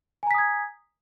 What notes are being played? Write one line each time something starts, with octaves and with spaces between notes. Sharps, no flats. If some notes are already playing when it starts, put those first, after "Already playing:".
G#5 A#5 D#6 G#6 B6